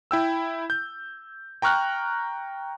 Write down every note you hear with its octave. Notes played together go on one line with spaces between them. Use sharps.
E4 G5 E6
G6
G5 A#5 C#6 F6 F#6